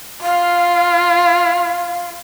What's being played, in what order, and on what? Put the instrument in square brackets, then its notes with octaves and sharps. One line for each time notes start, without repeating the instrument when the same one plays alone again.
[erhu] F4 [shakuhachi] F5